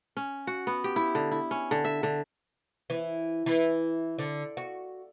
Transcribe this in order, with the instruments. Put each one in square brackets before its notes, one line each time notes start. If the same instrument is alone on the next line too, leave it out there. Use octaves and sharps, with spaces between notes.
[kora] C#4
F#4
B3
G4
E4
D3
E4
C#4
D3
E5
D3
[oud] E3
E3
D3
F#4